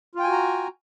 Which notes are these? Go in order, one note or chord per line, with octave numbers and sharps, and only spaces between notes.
F4 F#4 G5 G#5 A#5